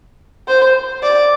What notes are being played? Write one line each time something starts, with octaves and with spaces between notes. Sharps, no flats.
C5
D5